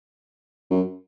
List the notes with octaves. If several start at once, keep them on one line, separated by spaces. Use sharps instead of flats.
F#2